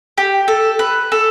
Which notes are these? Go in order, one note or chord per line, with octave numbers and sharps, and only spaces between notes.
G4
A4
B4
A4